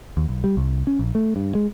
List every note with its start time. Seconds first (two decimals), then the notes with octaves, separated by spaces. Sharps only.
0.17 D#2
0.29 B1
0.44 G3
0.57 C2
0.87 C#4
0.99 A#1
1.15 A3
1.36 G2
1.55 G#3